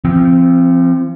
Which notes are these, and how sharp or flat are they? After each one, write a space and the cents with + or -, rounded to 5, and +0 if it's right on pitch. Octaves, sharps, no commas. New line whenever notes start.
F3 -30 C4 +0